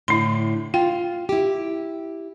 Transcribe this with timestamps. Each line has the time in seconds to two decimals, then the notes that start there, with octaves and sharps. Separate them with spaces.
0.08 A2 D3 E4 C6
0.74 F4 G5
1.29 E4 G4